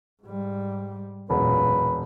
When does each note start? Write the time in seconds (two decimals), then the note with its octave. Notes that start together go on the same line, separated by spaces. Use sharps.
0.23 G#2 G3
1.30 E1 F#2 A#2 B4